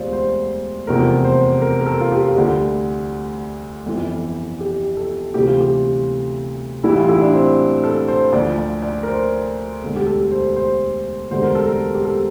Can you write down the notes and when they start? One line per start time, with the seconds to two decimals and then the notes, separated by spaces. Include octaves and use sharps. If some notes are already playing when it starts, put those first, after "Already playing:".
Already playing: E1 D2 D3 G3 F4 C5 D5
0.13 C5
0.87 F1 E2 C3 F3 A#4
1.24 C5
1.62 A#4
1.81 A#4
1.86 A4
2.01 F4
2.12 G4
2.28 F4
2.36 D2 D3 G3 G4
3.86 G1 F2 E3
4.60 G4
4.97 A4
5.34 D2 C3 E3 G3 G4
5.48 F4
5.61 G4
6.84 A1 A2 E3 G3 E4
6.98 F4
7.09 E4
7.21 D4
7.34 C4
7.84 A4
8.08 C5
8.33 D2 D3 F3 D5
8.58 D5
8.82 D5
9.03 A#4
9.08 C5
9.82 E1 D2 D3
9.96 G4
10.07 A4
10.31 C5
10.56 C5
11.31 E1 D2 D3 G3 C5
11.43 A#4
11.55 A4
11.67 A#4
11.95 G4
12.05 A4